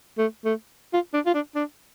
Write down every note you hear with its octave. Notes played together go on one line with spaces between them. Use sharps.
A3
A3
F4
D4
F4
D4
D4